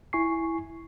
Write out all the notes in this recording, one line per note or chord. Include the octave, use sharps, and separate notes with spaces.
E4 G#5 C#6 C7